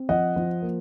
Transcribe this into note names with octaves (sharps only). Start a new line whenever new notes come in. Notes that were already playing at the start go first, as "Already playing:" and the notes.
Already playing: C4
F3 D#5 F#5
F3
A#3